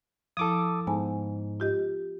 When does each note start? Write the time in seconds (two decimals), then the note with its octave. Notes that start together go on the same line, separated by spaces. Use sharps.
0.37 F3 E4 A4 D6 D#6
0.87 G#2 B3 G#5 A5
1.60 F4 G4 D#5